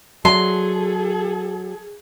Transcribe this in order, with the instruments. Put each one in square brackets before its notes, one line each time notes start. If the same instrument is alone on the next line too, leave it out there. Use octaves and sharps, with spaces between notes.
[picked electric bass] F#3 [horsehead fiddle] G#4 A4 [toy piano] D5 E5 A5 [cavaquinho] C6